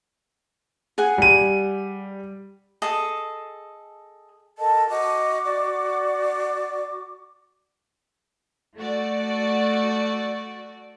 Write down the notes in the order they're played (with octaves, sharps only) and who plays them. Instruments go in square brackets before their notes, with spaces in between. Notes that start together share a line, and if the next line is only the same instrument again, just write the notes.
[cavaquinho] G#4 F#5 G#5
[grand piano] G3 D#7
[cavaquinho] G#4 A4 D#5
[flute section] A4 A#4 D#5 [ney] A5
[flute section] F#4 D6 [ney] D#5
[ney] D5
[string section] A3 F#4 D5